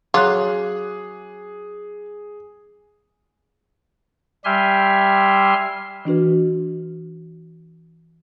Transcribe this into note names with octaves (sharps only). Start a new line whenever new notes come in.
F#3 C#4 F4 G#4 D6 F#6
G3 G4 E5 G#5 C6 F6
E3 D4 F#4 B4